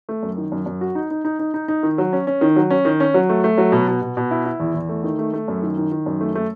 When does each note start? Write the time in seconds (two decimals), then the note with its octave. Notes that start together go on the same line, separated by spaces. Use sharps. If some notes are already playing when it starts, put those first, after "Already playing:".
0.09 A3
0.23 F#2
0.37 D#3
0.52 F#2
0.66 F#2
0.81 F#4
0.95 D#4
1.11 D#4
1.25 D#4
1.39 D#4
1.54 D#4
1.68 D#4
1.83 D#3
1.98 F#3
2.13 C#4
2.27 C#4
2.41 D#3
2.56 F#3
2.70 C#4
2.85 D#3
3.00 C#4
3.14 F#3
3.29 A3
3.44 A3
3.58 F#3
3.72 B2
3.87 B2
4.02 B2
4.17 B2
4.31 E4
4.46 E4
4.60 E2
4.74 E2
4.89 A3
5.03 D#3
5.19 A3
5.33 A3
5.48 F#2
5.62 D#3
5.77 D#3
5.92 D#3
6.06 F#2
6.21 A3
6.35 A3